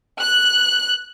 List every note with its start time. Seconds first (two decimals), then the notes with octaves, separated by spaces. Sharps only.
0.21 F#6